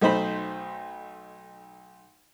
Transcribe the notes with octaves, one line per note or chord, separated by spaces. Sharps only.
B1 A3 D#4 C5 B5